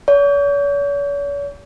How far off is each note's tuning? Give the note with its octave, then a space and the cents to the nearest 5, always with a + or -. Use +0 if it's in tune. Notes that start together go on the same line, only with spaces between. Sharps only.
C#5 +45